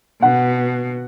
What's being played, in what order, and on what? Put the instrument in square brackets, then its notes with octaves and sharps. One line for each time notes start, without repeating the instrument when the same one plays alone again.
[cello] B2 [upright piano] F#5